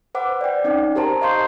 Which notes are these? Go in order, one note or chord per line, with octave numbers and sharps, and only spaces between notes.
B4 C5 F#5 D6
D5 G5
C4 C#4 D#4
G4 A#4 C5 A5 A#5
D#5 F5 C6 C#6 G6 C7